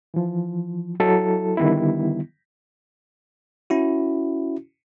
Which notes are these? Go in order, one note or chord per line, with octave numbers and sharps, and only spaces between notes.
E3 F3
F#3 E4 A4
D3 D#3 G3 B3 E4
C#4 E4 F#4